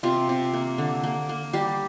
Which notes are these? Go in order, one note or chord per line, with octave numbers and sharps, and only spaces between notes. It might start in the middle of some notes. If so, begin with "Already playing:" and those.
C3 F4
C3
A#3
D3
A#3
A#3
G3 G4